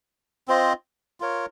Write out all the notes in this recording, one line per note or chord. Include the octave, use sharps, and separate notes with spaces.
C4 F4 C5 D#5
F4 A#4 C#5